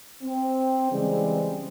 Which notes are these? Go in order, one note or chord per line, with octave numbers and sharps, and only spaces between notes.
C4
C#3 E3 G3 G#3 C4